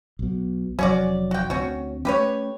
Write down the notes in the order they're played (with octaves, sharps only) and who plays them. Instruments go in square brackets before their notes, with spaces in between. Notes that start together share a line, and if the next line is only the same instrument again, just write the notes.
[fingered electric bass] B1 B2
[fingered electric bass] F1 F2 F#3 [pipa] C#4 F#4 D5
[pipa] F#4 G5
[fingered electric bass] D2 A#3 C4 [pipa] C#4 F#4
[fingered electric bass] A3 C#4 [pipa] G4 B4 C#5